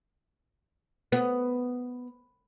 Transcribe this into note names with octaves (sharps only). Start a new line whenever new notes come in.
B3